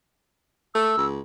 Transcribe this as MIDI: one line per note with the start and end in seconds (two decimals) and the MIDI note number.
0.75 0.93 57
0.75 1.06 88
0.97 1.20 37